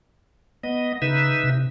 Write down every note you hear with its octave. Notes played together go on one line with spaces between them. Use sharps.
B3 D#5
C#3 D#4 B4 E5
C3